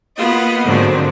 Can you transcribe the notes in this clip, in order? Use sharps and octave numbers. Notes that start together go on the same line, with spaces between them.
A#3 B3 F4 D#5
G#2 D3 D#3 F3 F#3 C4